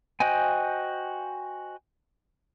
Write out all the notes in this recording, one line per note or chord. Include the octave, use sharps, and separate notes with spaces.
F#4 C5 D#5 G5 G#5